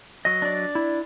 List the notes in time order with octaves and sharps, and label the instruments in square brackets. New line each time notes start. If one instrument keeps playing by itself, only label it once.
[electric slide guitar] F#3 D#5
[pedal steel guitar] D4 D5
[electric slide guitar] E4